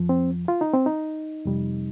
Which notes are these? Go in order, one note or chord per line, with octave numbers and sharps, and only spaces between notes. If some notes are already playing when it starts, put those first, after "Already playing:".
Already playing: F2 F3
C4
F4
D#4
C4
D#4
F2 C3 G3